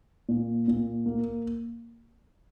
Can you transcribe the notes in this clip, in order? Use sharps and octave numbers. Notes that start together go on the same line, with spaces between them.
A#2
A#2
A#3